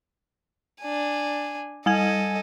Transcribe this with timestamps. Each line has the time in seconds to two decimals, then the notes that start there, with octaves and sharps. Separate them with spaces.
0.81 D4 G#5
1.86 G3 A4 D#5 G#5 G#6